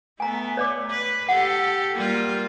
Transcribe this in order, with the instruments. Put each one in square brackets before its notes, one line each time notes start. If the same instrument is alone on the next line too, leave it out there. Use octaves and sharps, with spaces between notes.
[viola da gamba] A3 B3 [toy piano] G#5 A#5
[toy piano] C#5 D5 D6
[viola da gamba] B4
[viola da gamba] G4 A4 [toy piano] F#5
[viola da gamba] G3 A#3 F4